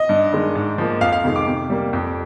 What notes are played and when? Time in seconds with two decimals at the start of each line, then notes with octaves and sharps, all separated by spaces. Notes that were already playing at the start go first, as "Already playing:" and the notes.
Already playing: D#5
0.09 G2
0.33 D#3 G#3
0.55 G#2
0.78 F3 A#3
1.01 F2 F5
1.13 F5
1.24 C3 D#3 G#3
1.36 D6
1.47 C3
1.70 G3 A#3
1.93 F2